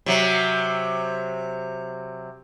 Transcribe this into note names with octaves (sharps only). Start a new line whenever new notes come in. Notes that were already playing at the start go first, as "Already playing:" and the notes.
C3 F#3